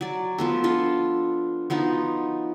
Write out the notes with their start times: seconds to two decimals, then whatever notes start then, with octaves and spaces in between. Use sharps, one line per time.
0.01 F#3 D5
0.38 F3 B3 A4
0.64 D4 F4 A4
1.70 F3 B3 D#4 F#4